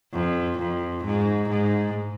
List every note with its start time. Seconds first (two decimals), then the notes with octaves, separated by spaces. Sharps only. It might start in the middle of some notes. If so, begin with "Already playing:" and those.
0.13 F2
0.58 F2
1.04 G#2
1.49 G#2